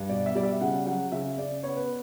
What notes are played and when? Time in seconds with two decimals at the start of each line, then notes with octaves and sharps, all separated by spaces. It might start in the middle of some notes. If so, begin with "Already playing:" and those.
Already playing: G2
0.09 B2 D5
0.26 E5
0.35 G3 D5
0.43 E5
0.61 C#3 F#5
0.86 F#3 F#5
1.12 C#3 E5
1.38 C#3 D5
1.63 B3 C#5
1.76 B4